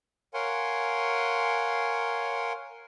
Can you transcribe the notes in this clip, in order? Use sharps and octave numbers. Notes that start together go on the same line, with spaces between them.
A#4 C#5 F5 F#5 G#5 C6